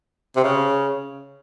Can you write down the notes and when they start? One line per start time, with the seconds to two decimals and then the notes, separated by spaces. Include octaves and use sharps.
0.36 C3
0.44 C#3